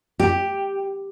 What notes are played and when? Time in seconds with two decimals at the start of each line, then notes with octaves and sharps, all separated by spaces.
0.20 G4